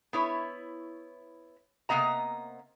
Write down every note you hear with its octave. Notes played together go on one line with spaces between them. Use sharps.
B3 E4 C#5
C3 A#3 B3 D#5 A#5